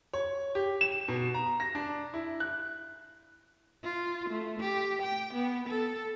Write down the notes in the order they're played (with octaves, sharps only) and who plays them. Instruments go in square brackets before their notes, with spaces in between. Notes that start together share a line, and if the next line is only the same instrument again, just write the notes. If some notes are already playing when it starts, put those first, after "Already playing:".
[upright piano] C#5
G4
E7
B2
A#5
A#6
D4
E4
F#6
[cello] F4
A3
G4
G5
B3
A4